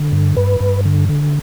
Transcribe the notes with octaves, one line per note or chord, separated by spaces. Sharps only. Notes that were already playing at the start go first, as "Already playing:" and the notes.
Already playing: D3
G2
G2 B4
G2
D3
D3